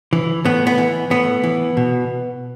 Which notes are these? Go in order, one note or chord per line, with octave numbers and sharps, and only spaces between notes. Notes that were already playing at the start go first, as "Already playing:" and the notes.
E3
A2 B3
B3
E3
A2 B3
E3
B2